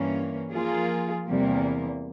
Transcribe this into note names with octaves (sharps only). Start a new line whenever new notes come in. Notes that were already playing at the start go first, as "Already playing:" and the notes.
Already playing: G2 E3 A#3 C#4
F3 A#3 F4 G#4
E2 C3 G3 A#3